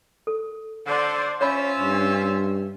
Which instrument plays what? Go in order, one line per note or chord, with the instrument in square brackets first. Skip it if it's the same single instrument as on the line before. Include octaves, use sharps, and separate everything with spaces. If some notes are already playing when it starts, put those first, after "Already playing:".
[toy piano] A4
[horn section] D3 [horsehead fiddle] C5 D5
[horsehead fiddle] C#4 [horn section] F4 C5 E5 [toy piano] C#5 B5
[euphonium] G2